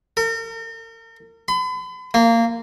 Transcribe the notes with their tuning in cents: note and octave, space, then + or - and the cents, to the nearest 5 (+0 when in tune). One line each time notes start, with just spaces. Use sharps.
A#4 -40
B5 +40
A#3 -20